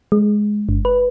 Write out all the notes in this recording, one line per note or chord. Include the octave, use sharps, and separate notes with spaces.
G#3
G1
B4